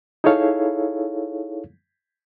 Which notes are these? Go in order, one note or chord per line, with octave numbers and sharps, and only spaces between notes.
D#4 E4 G#4 A4 C#5 F5